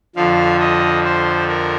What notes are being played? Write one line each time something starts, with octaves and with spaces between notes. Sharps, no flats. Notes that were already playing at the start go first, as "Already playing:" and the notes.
F2 D3 F3 F5
D#5
C5
A#4